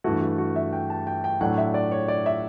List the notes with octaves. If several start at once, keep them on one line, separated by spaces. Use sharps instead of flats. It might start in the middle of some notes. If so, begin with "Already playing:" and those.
G2 E3 A3 F#4
F#4
F#4
E5
G5
A5
G5
G5
A2 F#3 A3 D4 F#5
E5
D5
C#5
D5
E5